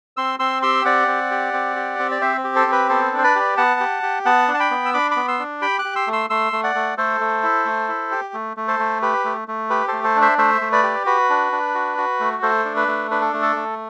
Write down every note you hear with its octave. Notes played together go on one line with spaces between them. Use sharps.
C4 C6 E6
C4 C6 E6
G4 C6 E6
C4 D5 F#5
C4
G4
C4
G4
C4
D5
C4 C5 E5
G4
A4 C5
C4
B4
B3 A4 C5
D4
C5
B4 D5
G4
B3 F#5 A5
G4
G4
B3 F#5 A5
D4
A5
G5 B5
B3
E6
D4 B5 D6
B5 D6
B3
C6 E6
D4
G4 G5 B5
D6 F#6
G4
C6 E6
A3
C6 E6
A3 C6 E6
A3
D5 F#5
A3
A3 A4 C5
A3
E4
A3
E4
G4
A3
A3
A4 C5
A3
G4 B4
A3
A3
G4 B4
A4 C5
A3
A4 C5
D4
C5 E5
A3 C5 E5
A3
B4 D5
G4
F#4 B4
D4
D4
F#4
F#4
A3
A3 A4 C5
D4
B4
A3
D4 B4
A4
A3
A4
A3